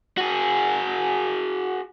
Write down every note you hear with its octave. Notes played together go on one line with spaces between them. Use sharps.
F#4 G#4